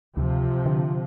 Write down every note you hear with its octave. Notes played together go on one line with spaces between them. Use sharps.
D2 C3 F3
D3